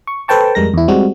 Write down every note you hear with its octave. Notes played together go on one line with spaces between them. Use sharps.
C#6
A4 B4 C5 G5 A5 C#6
F2 G3 G#3 A#4 A#6
E2 E4
G3 G#3 C4 F#4